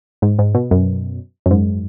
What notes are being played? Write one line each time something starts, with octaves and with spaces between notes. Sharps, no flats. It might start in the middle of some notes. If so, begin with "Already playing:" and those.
G#2
G#2
B2
F#2
F#2
G#2